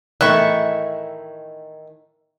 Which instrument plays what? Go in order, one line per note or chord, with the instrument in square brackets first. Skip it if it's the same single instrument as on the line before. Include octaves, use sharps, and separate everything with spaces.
[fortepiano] A2 E3 A3 [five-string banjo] D#3 E4 [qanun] E5 C#6 [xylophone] F#6